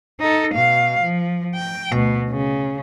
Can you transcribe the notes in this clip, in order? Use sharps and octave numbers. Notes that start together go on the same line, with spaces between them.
D#4 A4
B2 F5
F3
G5
D2 B2
C#3